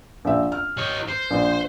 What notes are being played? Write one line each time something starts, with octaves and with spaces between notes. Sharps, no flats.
A#1 E5
F6
D#4 C#5
C5
A#1